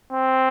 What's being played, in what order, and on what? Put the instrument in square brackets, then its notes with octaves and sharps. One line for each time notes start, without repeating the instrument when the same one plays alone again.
[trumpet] C4